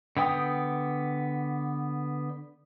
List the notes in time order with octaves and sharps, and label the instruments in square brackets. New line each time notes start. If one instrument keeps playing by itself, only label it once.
[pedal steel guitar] D3 B3 G5 D#6